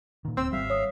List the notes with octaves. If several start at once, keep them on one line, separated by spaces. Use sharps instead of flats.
A#2 D#3
D1 C4 E6
G#1 G3 E5 F5
C#5 D#6